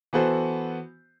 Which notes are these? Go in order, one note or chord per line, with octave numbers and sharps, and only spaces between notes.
E3 B3 F#4 A4 C5